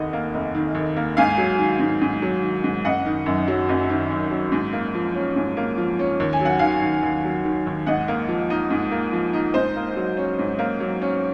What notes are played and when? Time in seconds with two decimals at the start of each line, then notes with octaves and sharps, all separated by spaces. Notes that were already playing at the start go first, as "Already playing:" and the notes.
Already playing: F1 D#2 D#3 D#5 F#5
0.13 A#3
0.34 F1
0.55 D#3
0.75 D#2
0.96 A#3
1.17 G#2 F5 G#5
1.38 F#3
1.58 D#3
1.79 G#2
2.01 G#2
2.22 F#3
2.42 D#3
2.64 G#2
2.85 F#1 D#5 F#5
3.06 D#3
3.26 F#2
3.48 F#3
3.69 F#1
3.89 D#3
4.10 F#2
4.31 F#3
4.52 G#2
4.73 A#3
4.95 F3
5.15 C#4
5.36 G#2
5.57 A#3
5.77 F3
5.99 C#4
6.20 D#2
6.33 G#5
6.41 F#3 F#5
6.59 D#3 F5 G#5
6.83 D#2
7.03 D#2
7.24 F#3
7.45 D#3
7.67 D#2
7.86 G#2 D#5 F#5
8.08 A#3
8.28 F3
8.50 D#4
8.70 G#2
8.91 A#3
9.13 F3
9.33 D#4
9.54 G#2 C5 D#5
9.76 A#3
9.96 F#3
10.17 C#4
10.39 G#2
10.59 A#3
10.80 F#3
11.02 C#4